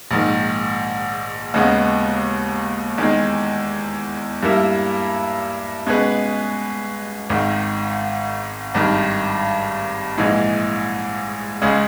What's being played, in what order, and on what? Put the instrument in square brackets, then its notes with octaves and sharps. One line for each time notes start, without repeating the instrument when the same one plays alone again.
[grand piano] A#1 G#2 D#3
D#2 C#3 G#3 B3
E2 D#3 G#3
G2 G3 A#3 E4
B2 G#3 C#4 G#4 B4
G#1 G#2 D#3
G#1 G2 D#3
A#1 G#2 E3 G#3
C#2 C#3 G#3 C#4 G#4